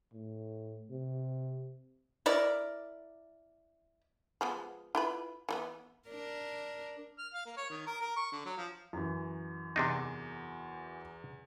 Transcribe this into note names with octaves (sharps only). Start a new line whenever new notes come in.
A2
C3
E4 A#4 D5
F3 G#3 B3
E4 F4 B4
E3 G3 B3
D4 A#4
F6
F5
A#3
C#5
D#3
A#4
A#4
C#6
D3
F#3
F3
F#2 E3
E2 C3 D4 D#4